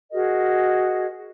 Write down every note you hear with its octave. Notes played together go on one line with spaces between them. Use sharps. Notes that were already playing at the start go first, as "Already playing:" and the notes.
F#4 G#4 A#4 D#5